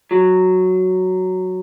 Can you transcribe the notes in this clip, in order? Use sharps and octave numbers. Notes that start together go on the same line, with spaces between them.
F#3